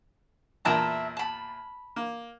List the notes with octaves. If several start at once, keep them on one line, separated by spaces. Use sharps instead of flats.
E2 A#2 A#4 E5 A5 A#5
A5 B5
A#3